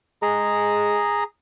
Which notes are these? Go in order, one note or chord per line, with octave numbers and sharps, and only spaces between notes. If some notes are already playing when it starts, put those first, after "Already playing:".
G#3 G#4 A#5